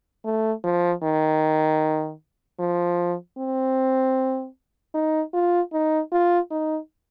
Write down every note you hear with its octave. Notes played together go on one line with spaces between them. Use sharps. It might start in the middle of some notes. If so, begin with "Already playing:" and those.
A3
F3
D#3
F3
C4
D#4
F4
D#4
F4
D#4